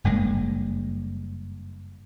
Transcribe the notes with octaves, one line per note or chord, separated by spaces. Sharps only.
F#1 G2 G#3 A#3